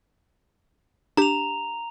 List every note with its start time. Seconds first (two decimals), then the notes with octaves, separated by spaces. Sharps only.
1.17 D4 G4 A#5 F7